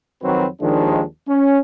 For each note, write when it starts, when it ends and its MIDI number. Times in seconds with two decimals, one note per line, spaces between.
0.23 0.47 41
0.23 0.47 51
0.23 0.47 54
0.23 0.47 60
0.23 0.47 66
0.23 0.47 71
0.61 1.03 39
0.61 1.03 51
0.61 1.03 53
0.61 1.03 56
0.61 1.03 62
1.28 1.58 61